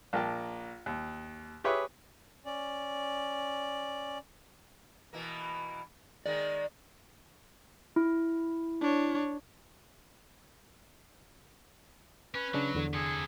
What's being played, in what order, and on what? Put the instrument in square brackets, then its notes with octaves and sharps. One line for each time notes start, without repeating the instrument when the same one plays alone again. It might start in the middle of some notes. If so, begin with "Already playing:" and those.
[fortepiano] A#1 A#4 G5 A5
D#2
G4 G#4 B4 C#5 E5
[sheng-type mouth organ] C#4 D5
[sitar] B2 E3 A#3
[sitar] D#3 G#3 A#3 [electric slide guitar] D5
[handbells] E4
[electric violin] D4 C#5
[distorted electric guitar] C#4 [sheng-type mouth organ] B4
[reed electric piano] C#3 C#4 D4 [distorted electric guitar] F#3
[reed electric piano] E2 D3
[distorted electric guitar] C3 A4 [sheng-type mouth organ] G#4